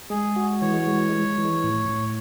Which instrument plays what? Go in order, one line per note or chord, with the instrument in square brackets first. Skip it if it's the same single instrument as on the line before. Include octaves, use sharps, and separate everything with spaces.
[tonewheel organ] G#3 [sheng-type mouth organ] G#4
[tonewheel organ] F#4
[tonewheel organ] E3 [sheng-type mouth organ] C#5
[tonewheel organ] G#3
G#3
E3
A2
A2